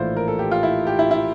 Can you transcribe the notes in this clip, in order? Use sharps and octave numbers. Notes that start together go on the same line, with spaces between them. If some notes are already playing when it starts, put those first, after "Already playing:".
Already playing: A#1 A2 E3 E4 F4 C5
A#4
A4
G4
F4
E4
G4
E4
E4